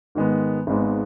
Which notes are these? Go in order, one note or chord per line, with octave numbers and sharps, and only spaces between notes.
G#2 D#3 G#3 B3
G#1 G#2 G#3 B3